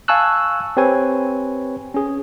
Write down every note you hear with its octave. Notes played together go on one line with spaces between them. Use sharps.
F5 G#5 A5 C#6 E6 F#6
C4 G4 B4 C#5 G#5
C#4 G#4